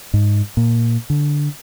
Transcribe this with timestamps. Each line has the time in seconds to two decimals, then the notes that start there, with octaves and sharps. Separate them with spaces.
0.13 G#2
0.57 A#2
1.10 D3